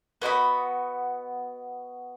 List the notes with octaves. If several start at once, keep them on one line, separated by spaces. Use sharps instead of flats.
B3 F#4 D#5 B5